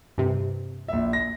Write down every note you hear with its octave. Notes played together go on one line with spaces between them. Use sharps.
G2 C3
A#1 E5
A#6